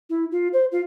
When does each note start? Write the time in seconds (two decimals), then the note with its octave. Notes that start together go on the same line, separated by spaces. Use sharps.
0.10 E4
0.32 F4
0.53 C5
0.72 F4